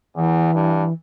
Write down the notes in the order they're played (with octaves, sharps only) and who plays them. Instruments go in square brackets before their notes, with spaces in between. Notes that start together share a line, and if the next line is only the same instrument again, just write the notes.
[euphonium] E2 [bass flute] E3
[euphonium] G2